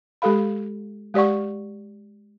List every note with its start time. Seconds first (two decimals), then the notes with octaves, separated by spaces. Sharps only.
0.22 G#3 G4 A4 F5 B5
1.14 G#3 G4 D5 F#5 C#6